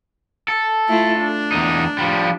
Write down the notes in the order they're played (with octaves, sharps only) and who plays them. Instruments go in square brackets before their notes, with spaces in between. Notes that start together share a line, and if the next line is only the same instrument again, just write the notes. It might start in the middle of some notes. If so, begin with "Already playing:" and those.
[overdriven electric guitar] A4
[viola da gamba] A3 E4 F4
D4
[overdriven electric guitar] E2 D#4
F3 G3